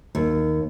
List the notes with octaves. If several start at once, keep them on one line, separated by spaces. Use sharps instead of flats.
D#2